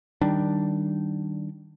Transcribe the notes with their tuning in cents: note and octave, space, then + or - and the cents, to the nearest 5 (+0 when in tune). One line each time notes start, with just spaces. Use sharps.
D#3 +0 G3 -15 D4 +0